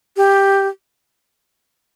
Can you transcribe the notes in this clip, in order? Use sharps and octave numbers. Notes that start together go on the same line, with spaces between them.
G4